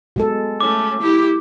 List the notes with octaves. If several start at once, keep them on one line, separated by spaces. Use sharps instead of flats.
B2 G#3 A4
A3 C#4 D6
E4 G4